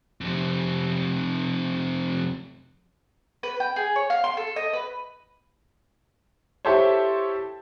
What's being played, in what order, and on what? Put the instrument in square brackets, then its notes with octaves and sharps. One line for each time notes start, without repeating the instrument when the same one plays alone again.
[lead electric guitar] F2 C3
[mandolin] B4
G5
G#4
C#5
F5
C6
A4
D#5
B4
[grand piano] E4 G4 A4 C5 C#5